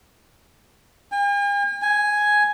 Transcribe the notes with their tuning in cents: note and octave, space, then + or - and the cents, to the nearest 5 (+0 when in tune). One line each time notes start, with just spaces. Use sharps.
G#5 -45
G#5 +5